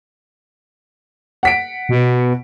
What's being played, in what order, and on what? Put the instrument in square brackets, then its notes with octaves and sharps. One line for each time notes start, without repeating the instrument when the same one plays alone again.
[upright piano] F#5 B6 D7
[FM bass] B2